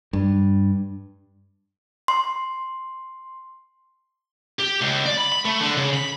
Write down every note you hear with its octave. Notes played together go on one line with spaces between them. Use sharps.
G2
C6
G4
C#2
D5
B5
B5
A3
D3
C#3
B5